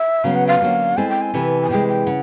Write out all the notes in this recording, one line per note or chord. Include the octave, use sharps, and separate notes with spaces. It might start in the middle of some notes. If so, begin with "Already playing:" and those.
Already playing: E5
C#3 F#3 B3 F5
F#5
F5
D3 F#3 A#3 C#4 F#4
G#3 C4 E4 A4 C5 G#5
G5
G#5
C3 E3 A3
G#5
C3 E3 G#3 G5
G5
C#3 F#5